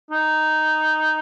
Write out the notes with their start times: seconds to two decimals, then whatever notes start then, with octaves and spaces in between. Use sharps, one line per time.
0.11 D#4